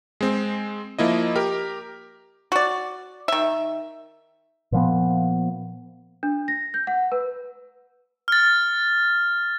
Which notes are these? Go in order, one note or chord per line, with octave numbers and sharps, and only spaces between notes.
G#3 C4
F3 A#3 E4 D#5
G4 A#4
F#4 D5
D#3 E5
A#2 F3 B3
D4
A#6
G6
F#5
B4
F6 A6